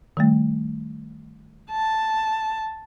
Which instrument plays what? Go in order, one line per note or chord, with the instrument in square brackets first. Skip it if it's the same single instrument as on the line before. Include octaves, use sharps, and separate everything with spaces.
[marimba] D#3 G3 A3
[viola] A5